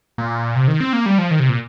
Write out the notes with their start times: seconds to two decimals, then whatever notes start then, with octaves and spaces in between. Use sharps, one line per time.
0.18 A#2
0.56 C3
0.68 D#3
0.81 C4
0.93 A#3
1.06 G3
1.18 F3
1.31 D#3
1.40 C3
1.49 A#2